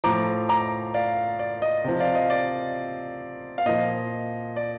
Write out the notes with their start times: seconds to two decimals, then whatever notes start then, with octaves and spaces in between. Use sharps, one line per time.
0.04 A2 F3 A#5 D6
0.49 A#5 D6
0.94 D5 F5
1.39 D5
1.62 D#5
1.84 C3 F3
2.00 D5 F5
2.15 D#5
2.30 D5
3.58 F5
3.66 A#2 F3 D#5
4.56 D5